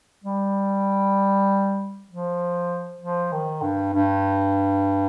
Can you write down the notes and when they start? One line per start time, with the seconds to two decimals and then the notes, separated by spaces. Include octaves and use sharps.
0.24 G3
2.09 F3
3.01 F3
3.32 D#3
3.63 G2
3.94 G2